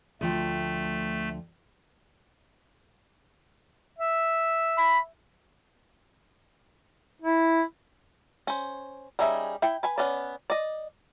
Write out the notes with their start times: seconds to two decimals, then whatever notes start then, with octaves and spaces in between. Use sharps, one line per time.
0.21 D2 F3 A3 G5
3.98 E5
4.78 B5
7.22 E4
8.47 C#4 C5
9.19 G3 C#4 D#4 G#4 E5
9.62 E4 G5
9.83 B4 G#5 B5
9.98 B3 C#4 B4 D5
10.50 D5 D#5